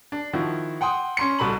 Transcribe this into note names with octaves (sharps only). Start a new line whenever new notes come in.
D4
D#3 F3 E4 F#4
F#5 G5 C6 D#6
C#4 C6 C#7
C2 B2 A4 B5 F#7